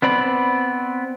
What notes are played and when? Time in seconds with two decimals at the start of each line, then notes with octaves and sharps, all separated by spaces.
0.02 B3 C4 D5 B5